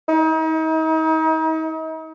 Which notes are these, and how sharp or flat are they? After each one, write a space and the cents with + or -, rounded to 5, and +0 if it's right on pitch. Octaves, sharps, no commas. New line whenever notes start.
D#4 +40